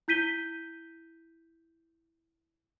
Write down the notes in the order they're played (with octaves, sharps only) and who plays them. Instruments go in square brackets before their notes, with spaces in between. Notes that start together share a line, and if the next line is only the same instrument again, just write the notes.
[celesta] E4 G6 B6 D#7 G7